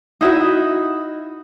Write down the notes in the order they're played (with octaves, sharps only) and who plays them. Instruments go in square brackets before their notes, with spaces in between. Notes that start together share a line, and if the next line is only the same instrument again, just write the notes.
[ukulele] D#4 E4 F#4 E5